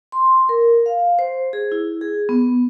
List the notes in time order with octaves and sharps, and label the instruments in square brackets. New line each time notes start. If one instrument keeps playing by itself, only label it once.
[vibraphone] C6
A#4
F5
C5
G#4
E4
G#4
B3